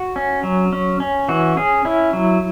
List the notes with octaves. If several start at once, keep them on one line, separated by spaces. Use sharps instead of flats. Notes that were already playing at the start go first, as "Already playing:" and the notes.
Already playing: F#4
C#4
F#3
C#4
C#4
E3 F#4
C#4 G#4
C#4 E4
F#3